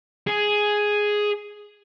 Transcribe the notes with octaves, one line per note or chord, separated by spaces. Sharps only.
G#4